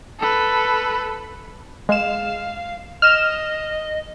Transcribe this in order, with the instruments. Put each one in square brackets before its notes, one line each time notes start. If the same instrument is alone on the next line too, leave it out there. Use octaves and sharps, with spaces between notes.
[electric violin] A4 B4
[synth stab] G#3 E7 [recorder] F5
[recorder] D#5 [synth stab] F6 E7